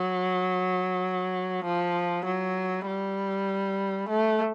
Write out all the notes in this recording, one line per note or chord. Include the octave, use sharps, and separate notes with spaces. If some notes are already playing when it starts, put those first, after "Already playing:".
Already playing: F#3
F3
F#3
G3
A3